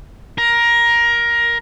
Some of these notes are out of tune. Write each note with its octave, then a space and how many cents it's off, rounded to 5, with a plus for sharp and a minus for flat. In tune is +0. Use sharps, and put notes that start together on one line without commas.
A#4 +15